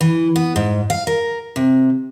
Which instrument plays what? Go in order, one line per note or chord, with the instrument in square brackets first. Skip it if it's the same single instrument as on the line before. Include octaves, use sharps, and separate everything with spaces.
[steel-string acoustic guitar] E3
B3
G#2
F5
A#4
C3